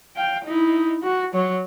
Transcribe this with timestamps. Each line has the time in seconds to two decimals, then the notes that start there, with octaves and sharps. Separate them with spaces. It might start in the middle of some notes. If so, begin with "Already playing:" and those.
0.16 F5 G5
0.45 D#4 E4
1.03 F#4
1.34 F#3 C#5